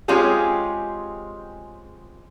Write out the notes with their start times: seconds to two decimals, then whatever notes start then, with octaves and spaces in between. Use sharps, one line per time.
0.08 G#3 C4 C#4 F4 G4 G#4